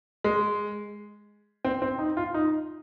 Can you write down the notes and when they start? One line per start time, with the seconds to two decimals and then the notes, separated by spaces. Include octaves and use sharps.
0.24 G#3
1.65 C4
1.82 C4
1.99 D#4
2.17 F4
2.34 D#4